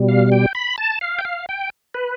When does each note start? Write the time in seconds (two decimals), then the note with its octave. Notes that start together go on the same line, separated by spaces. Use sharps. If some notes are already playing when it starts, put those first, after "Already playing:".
Already playing: B2 G3
0.08 F5
0.32 G5
0.55 B5
0.78 A5
1.01 F5
1.19 G5
1.25 F5
1.49 G5
1.94 B4